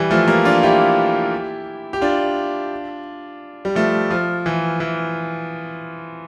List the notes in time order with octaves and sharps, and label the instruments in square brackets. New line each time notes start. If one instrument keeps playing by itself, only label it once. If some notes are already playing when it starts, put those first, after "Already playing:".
Already playing: [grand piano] E3 G3
F3 A3
G3 A#3
D4 F4
E4 G4
G4
D4 F4
G3
F3 A3
F3
E3
E3